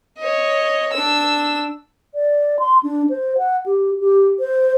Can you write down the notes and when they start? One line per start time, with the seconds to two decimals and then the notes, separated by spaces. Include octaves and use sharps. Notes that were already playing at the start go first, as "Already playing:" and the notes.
0.19 C#5 D#5
0.93 D4 E6
2.15 D5
2.59 C6
2.83 D4
3.10 C5
3.38 F#5
3.66 G4
4.00 G4
4.40 C5